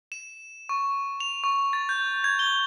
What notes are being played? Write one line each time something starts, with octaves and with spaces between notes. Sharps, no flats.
E7
C#6
F7
C#6
A6
G6
G#6
G7